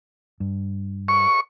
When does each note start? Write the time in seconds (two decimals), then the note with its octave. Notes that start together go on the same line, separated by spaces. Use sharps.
0.40 G2
1.08 C#6